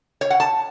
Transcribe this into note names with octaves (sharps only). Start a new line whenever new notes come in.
C#5
F#5
A5